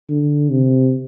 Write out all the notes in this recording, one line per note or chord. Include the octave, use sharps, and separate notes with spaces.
D3
C3